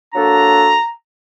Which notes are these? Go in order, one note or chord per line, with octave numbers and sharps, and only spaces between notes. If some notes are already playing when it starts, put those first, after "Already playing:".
F#3 A#3 D4 F#4 A4 A#5